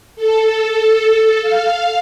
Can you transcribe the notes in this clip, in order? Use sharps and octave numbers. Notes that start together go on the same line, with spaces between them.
A4
F5